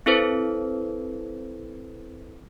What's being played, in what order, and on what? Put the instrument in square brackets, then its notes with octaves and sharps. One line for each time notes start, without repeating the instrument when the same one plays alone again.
[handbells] C4 E4 A4 B4 C5